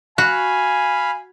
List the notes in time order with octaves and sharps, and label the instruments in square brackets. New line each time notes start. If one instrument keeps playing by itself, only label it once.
[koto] F#4 [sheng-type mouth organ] F5 B5 [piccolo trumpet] G#5